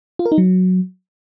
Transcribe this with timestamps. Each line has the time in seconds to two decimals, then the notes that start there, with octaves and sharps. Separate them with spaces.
0.19 F4
0.26 A#4
0.32 D#4
0.38 F#3